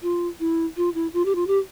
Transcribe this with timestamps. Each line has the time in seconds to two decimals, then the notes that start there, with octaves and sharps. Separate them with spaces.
0.02 F4
0.39 E4
0.76 F4
0.94 E4
1.13 F4
1.25 G4
1.35 F4
1.47 G4